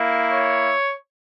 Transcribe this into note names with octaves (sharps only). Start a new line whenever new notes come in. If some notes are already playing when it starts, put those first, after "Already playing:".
Already playing: A#3 E4
C#5